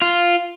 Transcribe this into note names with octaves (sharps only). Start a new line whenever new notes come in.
F4